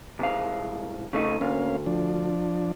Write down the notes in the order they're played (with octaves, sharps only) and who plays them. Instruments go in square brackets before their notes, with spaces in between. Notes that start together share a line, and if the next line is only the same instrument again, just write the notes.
[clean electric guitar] C2 G#2 F5
C#3 A3 D#4
[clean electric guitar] D2 [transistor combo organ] A#3 C#4 F5
[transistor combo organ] F3 D4